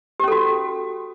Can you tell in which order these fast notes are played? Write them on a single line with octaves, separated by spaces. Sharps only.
G4 C#4 A4 F#4